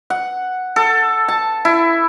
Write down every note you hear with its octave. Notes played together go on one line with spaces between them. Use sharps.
F#5
A4
A5
E4